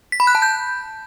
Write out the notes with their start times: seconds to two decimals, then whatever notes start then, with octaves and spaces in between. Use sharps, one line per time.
0.12 B6
0.20 B5
0.27 F#6
0.35 A5
0.42 G6